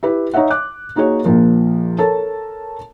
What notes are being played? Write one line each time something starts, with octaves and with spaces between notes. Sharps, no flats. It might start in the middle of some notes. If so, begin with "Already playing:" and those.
E4 G4 B4
D#4 C#5 D#5 E5 F#5
D6 F#6
A#3 D#4 F#4 G#4 C#5
A#1 A#2 F3 A#4
A4 A#4 C#5 A5